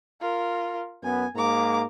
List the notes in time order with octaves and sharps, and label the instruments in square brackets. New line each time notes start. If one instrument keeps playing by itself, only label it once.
[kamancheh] F4 A#4
[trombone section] F#2 B3 [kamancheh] G#5
[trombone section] G#2 A#3 [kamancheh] A#5 D6